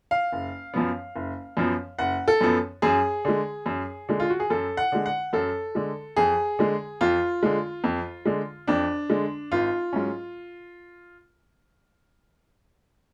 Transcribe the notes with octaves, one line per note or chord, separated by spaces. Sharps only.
F5
F#1
F#2 F3 B3
F#1
F#2 F3 B3
F#1 F#5
A4
F#2 F3 B3
F#2 G#4
D3 G#3
F#2
D3 G#3
F4
F#4
G#4
F#2 A4
F#5
D3 G#3
F#5
F#2 A4
D3 G#3
F2 G#4
D3 G#3
F2 F4
D3 G#3
F2
D3 G#3
F2 D4
D3 G#3
G#1 F4
G#2 F#3 C#4